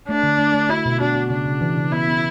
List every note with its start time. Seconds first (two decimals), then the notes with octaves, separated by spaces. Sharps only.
0.09 A3 D4
0.23 D3
0.38 A3
0.54 A3
0.69 E4 F#4
0.86 B2
1.01 D4 F#4
1.15 F#4
1.30 C#3 D4
1.46 C#3
1.61 E3
1.77 C#3
1.92 B3 E4
2.08 B3